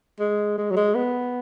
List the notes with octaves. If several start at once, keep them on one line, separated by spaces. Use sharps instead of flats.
G#3
G#3
F#3
G#3
B3